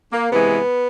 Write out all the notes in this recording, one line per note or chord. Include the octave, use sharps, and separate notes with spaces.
A#3
C3 E3 G#3 B3